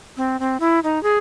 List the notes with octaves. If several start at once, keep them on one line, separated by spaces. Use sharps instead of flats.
C4
C4
E4
D#4
G#4